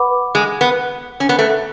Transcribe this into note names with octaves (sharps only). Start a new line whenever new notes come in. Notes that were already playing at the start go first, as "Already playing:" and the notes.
Already playing: B4 F#5 B5 D6
G#3
B3
C#4
B3
A3